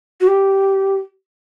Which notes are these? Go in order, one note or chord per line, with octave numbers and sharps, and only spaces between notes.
F#4
G4